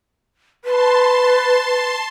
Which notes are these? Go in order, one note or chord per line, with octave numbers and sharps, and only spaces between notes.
B4 A5 C6